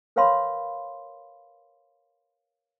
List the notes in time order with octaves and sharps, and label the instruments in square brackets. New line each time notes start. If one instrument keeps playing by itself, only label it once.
[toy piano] A#4 B4 C#5 F5 B5 C6